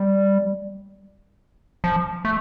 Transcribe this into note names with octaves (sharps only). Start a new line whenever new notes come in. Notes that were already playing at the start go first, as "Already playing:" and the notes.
Already playing: G3
F3
A3